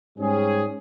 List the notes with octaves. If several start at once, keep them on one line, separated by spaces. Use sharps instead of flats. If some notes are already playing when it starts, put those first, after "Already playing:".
G#2 G3 C#4 G#4